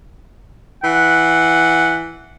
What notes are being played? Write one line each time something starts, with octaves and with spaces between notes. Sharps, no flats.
E3 F#5